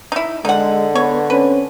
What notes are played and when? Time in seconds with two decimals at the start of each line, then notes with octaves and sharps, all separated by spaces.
0.12 D#4 E4
0.45 D3 G#3 D#4 F#5
0.95 B3 C#5
1.30 C4 C#4 B4